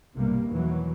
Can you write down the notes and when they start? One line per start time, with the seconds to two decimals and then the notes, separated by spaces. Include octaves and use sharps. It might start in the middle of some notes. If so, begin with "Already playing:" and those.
0.16 B1 G2 C3 G3 A#3
0.50 E2 B2 D#3 E3 F#3